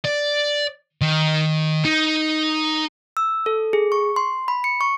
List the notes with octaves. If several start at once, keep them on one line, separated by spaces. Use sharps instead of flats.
D5
D#3
D#4
E6
A4
G#4
C#6
C6
B5
C#7
C#6